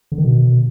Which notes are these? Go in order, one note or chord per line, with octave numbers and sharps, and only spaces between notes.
D3
D#3
B2